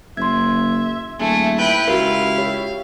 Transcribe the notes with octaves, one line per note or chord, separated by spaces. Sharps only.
F#1 E5 C6 G#6
D#1 A3 G#4
E4 B4 G5
C#2 F#4 G4 A#4 F5
G4 C#5